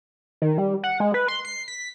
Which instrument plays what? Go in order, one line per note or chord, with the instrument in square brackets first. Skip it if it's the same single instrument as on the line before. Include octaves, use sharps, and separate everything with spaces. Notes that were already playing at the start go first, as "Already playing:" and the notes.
[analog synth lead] D#3
G3
F#5
G#3
B4
C6
C7
B6